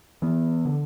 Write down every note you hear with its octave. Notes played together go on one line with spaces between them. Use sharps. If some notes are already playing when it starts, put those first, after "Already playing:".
E3 B3
D3